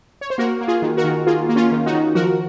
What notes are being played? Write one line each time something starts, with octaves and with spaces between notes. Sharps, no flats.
C#5
C5
A#3 F#4 A#4
A#3
F4 G#4
D#3
F#4 A#4
D#3
A#3 F4 G#4
A#3
C#4 F4
D#3
D#4 F#4
D#3
F3 F#4 A#4